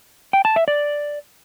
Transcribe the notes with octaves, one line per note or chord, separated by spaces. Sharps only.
G5
A5
E5
D5